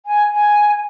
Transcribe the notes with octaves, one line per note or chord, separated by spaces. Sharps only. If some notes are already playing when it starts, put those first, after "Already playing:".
G#5
G#5